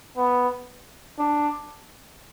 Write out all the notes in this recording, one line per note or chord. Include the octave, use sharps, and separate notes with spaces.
B3
D4